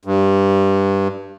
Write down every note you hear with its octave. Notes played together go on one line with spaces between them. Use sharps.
G2